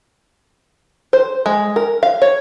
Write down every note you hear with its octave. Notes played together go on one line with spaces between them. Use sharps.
C5
G#3
A#4
F5
C#5